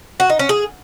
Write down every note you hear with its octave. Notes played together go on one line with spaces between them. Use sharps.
F#4
D#4
C#4
G#4